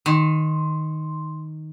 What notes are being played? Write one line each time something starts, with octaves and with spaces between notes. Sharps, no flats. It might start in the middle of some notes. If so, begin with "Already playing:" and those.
D#3 C6